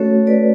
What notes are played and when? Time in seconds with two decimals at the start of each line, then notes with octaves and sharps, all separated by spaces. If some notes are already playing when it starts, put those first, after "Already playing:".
Already playing: A3 C#4 F#4 A4 C#5
0.27 B4 D5